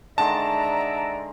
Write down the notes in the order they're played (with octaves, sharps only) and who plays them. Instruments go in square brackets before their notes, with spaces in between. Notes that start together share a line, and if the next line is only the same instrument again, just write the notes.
[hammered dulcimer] D3 D#3 G#3 [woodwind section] D5 E5 A#5 [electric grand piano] A5